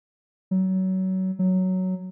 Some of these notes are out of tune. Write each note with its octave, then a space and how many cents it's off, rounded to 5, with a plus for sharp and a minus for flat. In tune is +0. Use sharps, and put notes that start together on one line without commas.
F#3 +25
F#3 +5